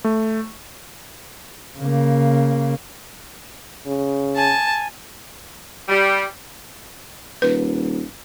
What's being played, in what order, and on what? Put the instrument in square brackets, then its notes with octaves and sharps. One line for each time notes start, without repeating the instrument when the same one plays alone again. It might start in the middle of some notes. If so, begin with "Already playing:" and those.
[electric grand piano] A3
[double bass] C#3 A#3
[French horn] C#3
[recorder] G#5 [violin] A5
[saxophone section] G3
[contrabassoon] D#1 [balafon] B4